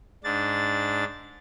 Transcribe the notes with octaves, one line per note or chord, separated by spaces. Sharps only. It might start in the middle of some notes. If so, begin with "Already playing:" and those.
G#2 D4 A6